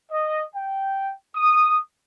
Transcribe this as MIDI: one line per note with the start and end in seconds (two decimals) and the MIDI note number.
0.11 0.42 75
0.56 1.12 79
1.36 1.80 87